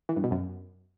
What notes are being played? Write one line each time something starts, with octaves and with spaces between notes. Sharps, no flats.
E3
G2
B2
F#2